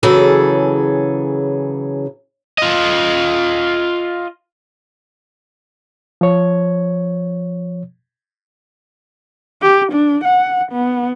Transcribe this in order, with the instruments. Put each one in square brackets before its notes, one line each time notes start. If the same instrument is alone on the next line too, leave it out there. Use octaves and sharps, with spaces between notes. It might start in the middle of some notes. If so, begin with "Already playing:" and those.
[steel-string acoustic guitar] C#3 E3 F#3 G#4 A4
[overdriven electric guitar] F4 D#5
[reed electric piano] F3 C#5
[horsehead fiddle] G4
D4
F#5
B3